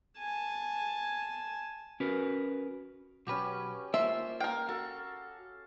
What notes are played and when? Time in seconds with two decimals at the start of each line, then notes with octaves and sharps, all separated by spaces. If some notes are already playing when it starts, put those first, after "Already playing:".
0.18 G#5 A5
2.00 C#4 F#4 A#4 B4
3.27 B1 C#4 F#4 G4 B4
3.94 A#3 F4 C5 E5
4.40 A#4 F5 G5
4.69 F#4 A4